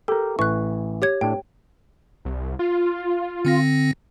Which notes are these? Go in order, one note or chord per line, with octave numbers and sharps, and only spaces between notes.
G4 A4 A#4
A1 E3 C#6 F#6
G4 C#5 G#6
A2 D4 G5
C2
F4
D3 C4 A#6